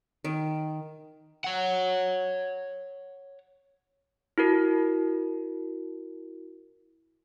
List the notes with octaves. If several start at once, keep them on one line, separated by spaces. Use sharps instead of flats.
D#3
C#5 F#5
E4 F#4 A#4